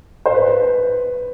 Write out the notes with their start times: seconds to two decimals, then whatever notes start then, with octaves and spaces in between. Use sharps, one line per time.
0.26 C5
0.34 B4